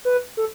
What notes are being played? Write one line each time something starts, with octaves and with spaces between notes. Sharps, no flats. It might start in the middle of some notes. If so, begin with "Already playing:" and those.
B4
A4